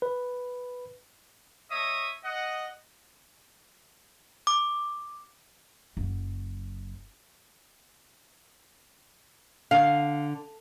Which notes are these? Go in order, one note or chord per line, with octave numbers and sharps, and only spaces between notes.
B4
A3 C#5 D#5 E5 D#6
D#5 F#5
D6
F#1 F#3
D3 F5